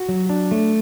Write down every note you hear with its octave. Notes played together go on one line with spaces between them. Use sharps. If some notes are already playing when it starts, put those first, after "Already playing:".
Already playing: F#4
F#3
D4
A3